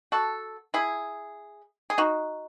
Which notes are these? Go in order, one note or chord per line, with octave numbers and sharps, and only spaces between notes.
F#4 A4
E4 G#4
G#4
D#4 F#4